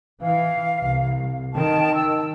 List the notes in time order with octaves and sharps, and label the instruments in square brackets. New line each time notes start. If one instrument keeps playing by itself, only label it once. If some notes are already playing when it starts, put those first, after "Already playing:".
[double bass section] E3 [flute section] F5
[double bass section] C2
[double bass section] D#3 [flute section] G5 A5
[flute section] E6